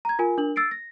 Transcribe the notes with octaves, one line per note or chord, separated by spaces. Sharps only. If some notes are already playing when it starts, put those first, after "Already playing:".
A#5 G#6
F4 A#4 G#5
D4 A#4 F#7
E6 A6 C7 D7
A#6